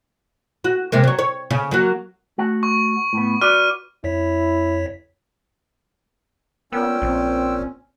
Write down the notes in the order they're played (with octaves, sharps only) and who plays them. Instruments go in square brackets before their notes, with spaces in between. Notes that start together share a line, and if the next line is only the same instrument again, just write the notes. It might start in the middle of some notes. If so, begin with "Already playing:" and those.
[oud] F#4
C3 G#3 A#3
F#3 C#5
C#5
C#3
F#3 A#3 F#4
[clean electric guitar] A3 F#4 F#5
[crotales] C#6
[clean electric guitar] A2 B3
[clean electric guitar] F#4 B4 D5 [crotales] F6 D#7
[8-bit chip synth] F2 C#5 B6 [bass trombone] E4
[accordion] A#2 C#4 [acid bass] B3 [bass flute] A#4 [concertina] G5 E6
[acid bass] A#1 [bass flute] C4